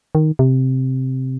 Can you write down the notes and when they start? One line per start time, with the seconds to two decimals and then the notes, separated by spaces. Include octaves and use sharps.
0.15 D#3
0.39 C3